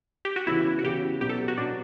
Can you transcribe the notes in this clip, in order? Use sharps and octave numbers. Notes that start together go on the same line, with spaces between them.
G4
F#4
C#3 E3 B3 E4
F#4
C#3 E3 B3 G4
B2 F#3 B3 G4
A4
F#4
B2 F#3 B3 D4